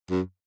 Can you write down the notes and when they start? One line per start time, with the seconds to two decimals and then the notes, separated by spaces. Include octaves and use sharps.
0.10 F#2